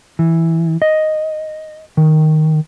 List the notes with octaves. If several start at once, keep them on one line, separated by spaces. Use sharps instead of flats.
E3
D#5
D#3